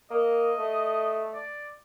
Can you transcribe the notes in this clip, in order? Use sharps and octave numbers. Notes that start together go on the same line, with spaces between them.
A#3 D#5
A3
D5